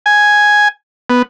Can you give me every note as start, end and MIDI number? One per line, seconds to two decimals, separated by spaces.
0.06 0.68 80
1.10 1.22 59